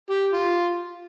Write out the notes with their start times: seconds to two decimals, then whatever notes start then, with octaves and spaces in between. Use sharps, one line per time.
0.10 G4
0.33 F4